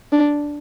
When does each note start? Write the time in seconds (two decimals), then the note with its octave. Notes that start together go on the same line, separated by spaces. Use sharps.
0.12 D4